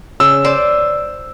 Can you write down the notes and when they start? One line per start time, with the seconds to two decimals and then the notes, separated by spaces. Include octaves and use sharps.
0.20 C#3 E6
0.45 C5 D5